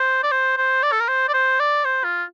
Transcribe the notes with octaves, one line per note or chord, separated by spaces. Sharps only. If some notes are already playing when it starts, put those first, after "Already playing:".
Already playing: C5
D5
C5
C5
D5
A4
A#4
C5
D5
C5
D5
C5
F4